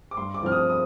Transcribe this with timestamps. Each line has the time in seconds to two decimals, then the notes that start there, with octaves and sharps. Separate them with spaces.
0.11 D6
0.17 G2 C6
0.34 D6
0.43 F3 C4 F6
0.52 D#6
0.69 D#6